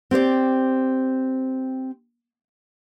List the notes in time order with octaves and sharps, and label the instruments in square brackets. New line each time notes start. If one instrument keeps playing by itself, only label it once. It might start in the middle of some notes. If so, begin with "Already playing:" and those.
[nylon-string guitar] C4 G4 C5 D5